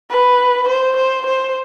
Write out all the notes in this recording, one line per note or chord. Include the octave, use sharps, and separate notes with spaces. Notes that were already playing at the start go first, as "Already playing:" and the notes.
B4
C5
C5
C5